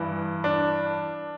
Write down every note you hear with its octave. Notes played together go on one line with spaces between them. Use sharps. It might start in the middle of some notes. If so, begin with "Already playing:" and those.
Already playing: G2 E3
D4